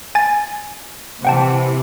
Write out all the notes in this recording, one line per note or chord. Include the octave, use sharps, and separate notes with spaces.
G#5 A6
C3 E3 F#5 G5 A5